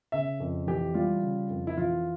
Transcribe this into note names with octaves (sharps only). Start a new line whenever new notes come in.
C#3 E5
F2
E3 G4
G3 F4
C#3
F2
E4
E3 F4